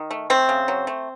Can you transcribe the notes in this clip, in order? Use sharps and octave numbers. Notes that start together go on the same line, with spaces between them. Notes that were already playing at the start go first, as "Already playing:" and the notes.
Already playing: D#3
A3
A3 C4
C#3
F#3
A3